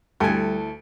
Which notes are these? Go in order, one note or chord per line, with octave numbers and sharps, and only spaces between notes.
D2 G3 E4 A4 G#5